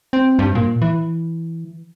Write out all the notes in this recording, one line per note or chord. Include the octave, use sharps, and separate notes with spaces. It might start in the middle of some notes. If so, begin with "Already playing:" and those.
C4
G2
A#2
E3